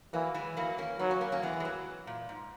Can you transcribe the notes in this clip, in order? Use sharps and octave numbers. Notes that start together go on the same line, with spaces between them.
E3 F#3 A#3
E3 G#3
E3 F#3 A#3
A#3 C#4
F#3 B3 D#4
A#3 C#4
A#3 C#4
A#3 C#4
E3 G#3 B3
G#3
F#3 A#3
A#2
G#2